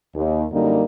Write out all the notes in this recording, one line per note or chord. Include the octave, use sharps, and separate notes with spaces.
D#2
F#2 D3 G3 A#3 D#4